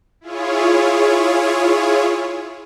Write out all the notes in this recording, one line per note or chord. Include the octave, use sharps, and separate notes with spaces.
E4 F4 G#4 C#5